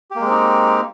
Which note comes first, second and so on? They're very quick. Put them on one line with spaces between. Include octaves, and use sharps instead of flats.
G4 A#3 G#3 C4 D#4